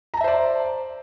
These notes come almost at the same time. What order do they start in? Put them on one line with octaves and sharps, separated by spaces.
A#5 A5 E5 C5 D5